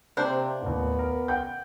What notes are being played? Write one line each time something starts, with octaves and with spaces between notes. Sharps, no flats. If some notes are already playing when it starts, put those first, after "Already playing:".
C3 A#3 D4 C5
D#2 A2 B3
A#4
F#5 G5 G6